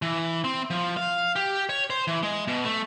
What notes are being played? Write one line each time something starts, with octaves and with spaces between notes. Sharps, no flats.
E3
C4
F3
F5
G4
C#5
C5
E3
G#3
B2
A3